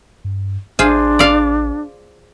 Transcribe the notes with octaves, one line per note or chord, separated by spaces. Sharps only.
G2
A1 D4 F4 G#4 C5
D5 F5